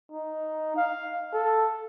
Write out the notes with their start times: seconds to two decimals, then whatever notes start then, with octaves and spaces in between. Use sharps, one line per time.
0.11 D#4
0.76 F5
1.33 A4